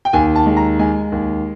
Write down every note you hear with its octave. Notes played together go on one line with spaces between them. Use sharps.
G5
D#2 G#5
A5
G#3
A#5
G#3 G#5
D#2